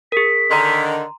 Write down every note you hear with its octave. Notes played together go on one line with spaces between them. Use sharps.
G#4 A#4 B6
D3 D#3 A#5 C6